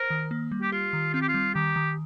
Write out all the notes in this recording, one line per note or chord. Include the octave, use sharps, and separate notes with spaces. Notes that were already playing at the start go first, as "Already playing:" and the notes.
Already playing: A#4 C5
D#3
A#3
G3
G4
F4 G4
D#3
C4 F4
G4
F4
G3
D#3 G4
D#3